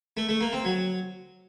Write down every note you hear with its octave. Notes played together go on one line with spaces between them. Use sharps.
A3
A3
A#3
C4
F#3